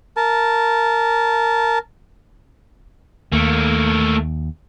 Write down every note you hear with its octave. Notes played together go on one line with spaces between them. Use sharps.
A#4 A5
D#2 A3 A#3